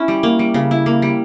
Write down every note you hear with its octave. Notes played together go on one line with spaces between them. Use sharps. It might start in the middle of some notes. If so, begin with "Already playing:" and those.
Already playing: C#4 E4 E5
G3
A#3
G3
C#3
E4
A#3
G3